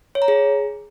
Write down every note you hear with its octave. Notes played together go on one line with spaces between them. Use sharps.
C#5
A#5
G#4